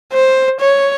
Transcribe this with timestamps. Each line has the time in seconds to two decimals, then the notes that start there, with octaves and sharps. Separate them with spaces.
0.13 C5
0.60 C#5